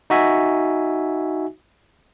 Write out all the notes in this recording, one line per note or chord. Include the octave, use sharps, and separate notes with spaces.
D#4 F#4 E5 G#5